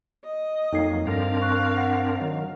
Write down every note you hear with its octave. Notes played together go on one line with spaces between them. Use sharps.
D#5
F2 F#3 A#3 D#4 A4 G5 G#6 C7
G2 C4 D4 A4 A#4 F5 A#6
C#6 F#6
F#5
D#3 F#3